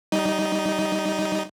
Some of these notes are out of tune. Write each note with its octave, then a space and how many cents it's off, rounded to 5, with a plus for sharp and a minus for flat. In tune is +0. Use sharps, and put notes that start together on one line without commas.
G3 -25 D#4 +0 D#5 +0